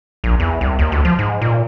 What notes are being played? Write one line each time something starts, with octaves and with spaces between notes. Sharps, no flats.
A#1
E2
C2
D#2
D2
F3
G#2
A#2